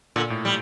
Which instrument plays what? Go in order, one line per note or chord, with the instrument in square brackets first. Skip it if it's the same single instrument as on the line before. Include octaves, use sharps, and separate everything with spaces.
[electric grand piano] A#2 [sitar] D3
[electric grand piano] A2
[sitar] G3